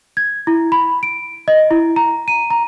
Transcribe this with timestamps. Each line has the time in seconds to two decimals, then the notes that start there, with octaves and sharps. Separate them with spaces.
0.17 G#6
0.47 E4
0.72 B5
1.03 D7
1.48 D#5
1.71 E4
1.96 A#5
2.28 D#7
2.50 A#5